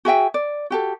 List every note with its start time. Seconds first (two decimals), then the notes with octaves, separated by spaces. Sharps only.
0.05 F#4 G#4 E5 G5
0.34 D5
0.70 F#4 G4 A4